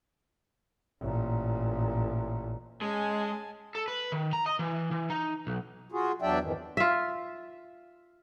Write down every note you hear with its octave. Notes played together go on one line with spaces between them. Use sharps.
A1 A#2
G#3 C#4 G#4 G#5 A5
A4
B4
D#3
A#5
D#5
E3
E3
D#4
B1
F4 F#4 G#4
E2 F#3 D4 D5 E5 G5
F2 G#2 D#3 E3
F4 E5